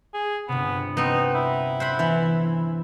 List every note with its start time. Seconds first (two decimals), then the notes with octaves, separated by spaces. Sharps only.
0.14 G#4
0.48 G1 C3 B3
0.97 B3 C4 D#4
1.35 E4
1.80 C5 F#5 B5
1.99 E3 B3